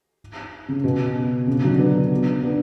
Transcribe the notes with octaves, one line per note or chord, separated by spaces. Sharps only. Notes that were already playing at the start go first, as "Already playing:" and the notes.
C#3
B2
C#3
D3 F#3
B3 D4
B3 D4